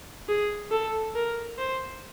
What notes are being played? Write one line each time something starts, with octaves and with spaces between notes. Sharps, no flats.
G#4
A4
A#4
C5